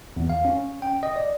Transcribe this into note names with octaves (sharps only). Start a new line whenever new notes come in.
E2
F5
C#4
G5
D#5
D5